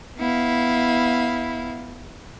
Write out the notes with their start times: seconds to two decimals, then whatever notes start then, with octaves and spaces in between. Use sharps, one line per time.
0.17 B3 E4 F5